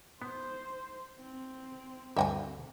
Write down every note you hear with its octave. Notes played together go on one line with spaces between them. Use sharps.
B3 C5
C4
D2 G2 F#4 E5 G5 G#5